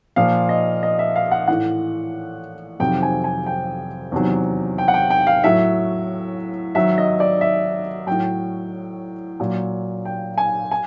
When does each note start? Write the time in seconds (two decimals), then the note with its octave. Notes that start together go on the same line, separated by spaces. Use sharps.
0.16 A#2 F3 F5
0.49 D#5
0.83 D#5
0.99 E5
1.16 F5
1.31 F#5
1.48 A2 E3 F#5
2.80 F2 C3 D#3 F#3 G5
3.02 G#5
3.24 G#5
3.46 G5
4.12 E2 C3 D#3 F#3
4.78 G5
4.88 F#5
4.94 G5
5.10 G5
5.27 F5
5.44 A2 F#3 E5
6.75 G#2 D#3 F#3 E5
6.98 D#5
7.20 D5
7.41 E5
8.07 A2 F#3 G5
9.40 A#2 F#3
10.05 G5
10.38 G#5
10.71 G#5